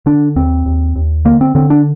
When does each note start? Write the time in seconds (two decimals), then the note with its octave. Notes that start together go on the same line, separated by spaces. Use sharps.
0.06 D3 D4
0.36 D#2 C4
0.66 D#2
0.96 D#2
1.25 D3 A#3
1.41 C4
1.55 D3 C4
1.70 D4